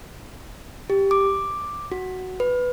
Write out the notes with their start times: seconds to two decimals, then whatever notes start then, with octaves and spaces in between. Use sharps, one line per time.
0.90 G4
1.11 D6
1.92 F#4
2.40 B4